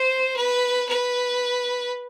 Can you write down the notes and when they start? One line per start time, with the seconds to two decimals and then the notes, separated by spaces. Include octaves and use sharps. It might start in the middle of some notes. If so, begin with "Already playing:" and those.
Already playing: C5
0.36 B4
0.89 B4